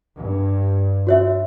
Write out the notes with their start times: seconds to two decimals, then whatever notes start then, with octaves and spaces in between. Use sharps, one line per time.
0.20 G2
1.07 F#4 C#5 E5